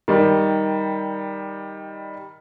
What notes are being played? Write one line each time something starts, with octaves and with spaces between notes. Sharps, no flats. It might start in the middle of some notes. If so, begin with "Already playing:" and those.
D#3 G3